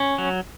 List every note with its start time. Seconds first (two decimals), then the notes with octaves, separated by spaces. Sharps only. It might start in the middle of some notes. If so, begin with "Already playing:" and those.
Already playing: C#4
0.18 F#3